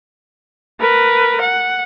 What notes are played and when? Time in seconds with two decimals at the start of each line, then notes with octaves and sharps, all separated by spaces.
0.80 A#4 B4
1.41 F#5